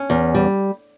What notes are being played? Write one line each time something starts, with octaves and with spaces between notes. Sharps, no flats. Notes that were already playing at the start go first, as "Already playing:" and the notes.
Already playing: C#4
E2
G3